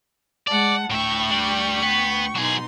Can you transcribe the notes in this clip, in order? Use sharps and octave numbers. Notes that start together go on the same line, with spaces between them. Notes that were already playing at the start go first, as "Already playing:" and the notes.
G#3 D5 F#5 A5
D2 A2 E5 G5 C#6
G3 D4
B3
B2 F#3 D#4 G#4 C6